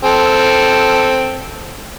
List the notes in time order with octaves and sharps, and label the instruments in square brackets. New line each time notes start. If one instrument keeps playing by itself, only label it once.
[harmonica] C4 A4